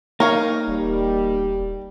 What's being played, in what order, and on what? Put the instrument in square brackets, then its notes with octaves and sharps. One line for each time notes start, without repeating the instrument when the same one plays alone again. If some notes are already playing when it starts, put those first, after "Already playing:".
[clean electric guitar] A#3 D#4 [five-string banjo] A#4 C#5 F5
[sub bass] D#1 [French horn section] G3